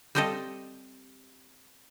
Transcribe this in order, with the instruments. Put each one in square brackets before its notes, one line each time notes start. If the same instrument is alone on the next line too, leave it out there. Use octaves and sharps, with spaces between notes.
[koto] G3 C4 G4 A4 D#5 F5